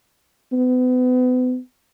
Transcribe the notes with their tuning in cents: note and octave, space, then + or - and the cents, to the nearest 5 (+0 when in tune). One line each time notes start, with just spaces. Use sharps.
B3 +35